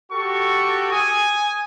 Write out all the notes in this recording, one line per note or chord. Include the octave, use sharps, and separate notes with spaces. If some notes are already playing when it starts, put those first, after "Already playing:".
F#4 G4 A4 C#6
G#5 D#6